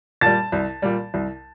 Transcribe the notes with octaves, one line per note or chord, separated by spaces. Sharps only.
A#2 G3 A5 A6
C2
A#2 G3
C2